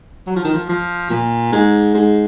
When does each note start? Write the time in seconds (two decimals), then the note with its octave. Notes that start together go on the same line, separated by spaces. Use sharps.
0.27 F#3
0.36 F3
0.45 D#3
0.54 F3
0.69 F3
1.10 A#2
1.52 G#2
1.95 G#2